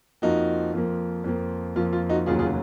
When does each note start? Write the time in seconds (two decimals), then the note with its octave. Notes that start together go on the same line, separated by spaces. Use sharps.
0.22 F2 F3 A#3 D#4 F#4
0.73 F2 F3 A#3
1.24 F2 F3 A#3
1.76 F2 F3 A#3 F4
1.93 F4
2.09 D#4 F#4
2.26 F1 D#2 C#3 F#3 F4 G#4
2.39 F4 G#4